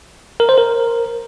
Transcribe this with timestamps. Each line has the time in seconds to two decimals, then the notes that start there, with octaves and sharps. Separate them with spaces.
0.40 A#4
0.49 C5
0.58 A#4